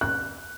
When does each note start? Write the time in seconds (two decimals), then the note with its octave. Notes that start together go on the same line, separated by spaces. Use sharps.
0.01 F#6